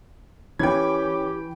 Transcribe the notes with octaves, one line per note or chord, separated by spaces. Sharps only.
E3 C#4 G4 G5 B5 G#6